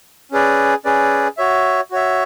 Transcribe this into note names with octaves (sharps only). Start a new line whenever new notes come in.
C#4 G#4 B4 D5
C#4 G#4 B4 D5
F#4 C#5 E5
F#4 C#5 E5